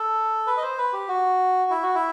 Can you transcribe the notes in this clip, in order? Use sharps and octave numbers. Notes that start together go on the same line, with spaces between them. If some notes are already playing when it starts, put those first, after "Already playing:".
Already playing: A4
B4
D#5
C5
B4
G4
F#4
E4
F#4
E4